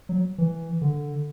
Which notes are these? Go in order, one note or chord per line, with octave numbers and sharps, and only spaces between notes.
F#3
E3
D3